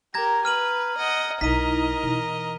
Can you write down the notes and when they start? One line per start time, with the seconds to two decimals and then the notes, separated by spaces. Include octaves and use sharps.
0.14 G4 A#4 A#5 G#6 A#6
0.45 B4 F6 D#7 F#7
0.98 D#5 F#5
1.41 B1 D#4 E4 A#4 D#5 B6 D#7
2.03 B2 E3